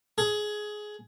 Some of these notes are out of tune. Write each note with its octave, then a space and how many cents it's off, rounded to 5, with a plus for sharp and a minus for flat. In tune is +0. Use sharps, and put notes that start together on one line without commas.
G#4 +15